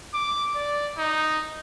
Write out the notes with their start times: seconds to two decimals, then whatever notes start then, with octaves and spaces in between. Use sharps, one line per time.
0.14 D6
0.56 D5
0.98 D#4